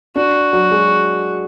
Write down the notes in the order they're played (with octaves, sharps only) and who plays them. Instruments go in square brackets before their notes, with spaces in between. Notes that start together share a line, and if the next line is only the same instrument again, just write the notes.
[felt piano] D4 [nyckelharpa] F#4
[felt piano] F#3
G#3